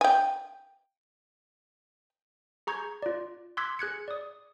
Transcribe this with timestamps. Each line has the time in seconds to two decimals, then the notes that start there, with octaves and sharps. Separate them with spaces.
0.01 G5 G#5
2.67 G#4 A#5 C#6 G6 G#6
3.02 F4 D5
3.57 C6 D6 E6 F#6 G#6 B6
3.79 G#4 F#6 G#6 C#7
4.08 D5 D#6